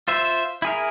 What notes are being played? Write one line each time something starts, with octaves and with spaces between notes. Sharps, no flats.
F4 C5 E5
E4 G#4 A#4